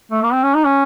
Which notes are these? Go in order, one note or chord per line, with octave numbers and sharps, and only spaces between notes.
A3
A#3
C4
C#4
D#4
C#4